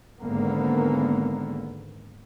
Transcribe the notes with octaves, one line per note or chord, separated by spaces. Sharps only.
G#1 G#2 D3 A#3 B3